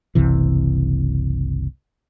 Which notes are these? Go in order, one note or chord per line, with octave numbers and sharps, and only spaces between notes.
F#1 C2 C3 E3